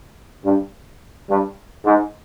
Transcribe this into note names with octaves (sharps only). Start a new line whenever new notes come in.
G2
G2
G#2